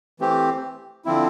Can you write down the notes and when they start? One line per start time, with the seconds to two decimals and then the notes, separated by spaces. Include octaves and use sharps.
0.20 E3 A3 C4 G4
1.05 D3 F3 C4 E4